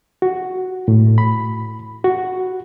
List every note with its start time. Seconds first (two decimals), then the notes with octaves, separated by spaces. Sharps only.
0.22 F#4
0.88 A2
1.18 B5
2.04 F#4